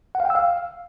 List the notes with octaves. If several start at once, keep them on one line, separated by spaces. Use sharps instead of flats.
F#5
F5
G5
E6
F5